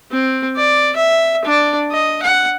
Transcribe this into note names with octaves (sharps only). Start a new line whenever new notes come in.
C4
D5
E5
D4 D5
D#5
F#5